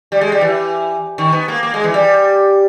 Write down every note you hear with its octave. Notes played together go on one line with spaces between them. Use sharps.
G3
G#3
G3
E3
D#3
B3
A#3
A#3
G#3
E3
G3